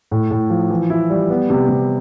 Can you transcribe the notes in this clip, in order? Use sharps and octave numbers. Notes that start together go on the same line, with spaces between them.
A2
A2
F3
E3
E4
G3
B3
C3
C3